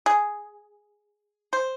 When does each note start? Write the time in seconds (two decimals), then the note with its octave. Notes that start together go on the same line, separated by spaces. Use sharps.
0.06 G#4
1.53 C5